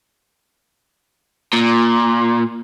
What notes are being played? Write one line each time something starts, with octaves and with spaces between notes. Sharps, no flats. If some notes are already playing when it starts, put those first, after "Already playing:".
A#2